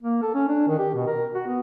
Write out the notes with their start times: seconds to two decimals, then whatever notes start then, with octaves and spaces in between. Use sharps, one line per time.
0.03 A#3
0.22 A4
0.35 C#4
0.49 D4
0.68 D#3
0.79 G4
0.95 B2
1.07 A#4
1.35 F#4
1.46 B3